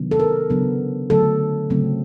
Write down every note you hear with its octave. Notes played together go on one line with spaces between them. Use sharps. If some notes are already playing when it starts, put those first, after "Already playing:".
Already playing: C3 D#3 F#3 B3 D4
A4
A#4
C#3 F#3 B3 D4
D3 F#3 A3 A4
C#3 F#3 A3 C4